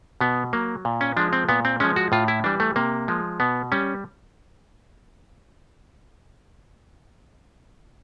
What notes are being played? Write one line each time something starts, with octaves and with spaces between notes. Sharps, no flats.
B2 B3
F#3 A#3
A#2
C#4
F3 G#3 D4
C4
A#2 B3
C4
F3 G#3 C#4
F#4
A2 F4
E4
E3 G3 D4
A3
C3 A#3
F3 G#3
B2 B3
G3 C#4